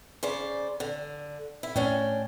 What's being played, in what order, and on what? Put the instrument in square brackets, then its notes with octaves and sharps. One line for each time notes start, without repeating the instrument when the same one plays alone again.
[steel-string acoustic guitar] C#3 C5 D5
D3
E4
[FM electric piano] A2 [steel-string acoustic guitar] C#4 D4 G5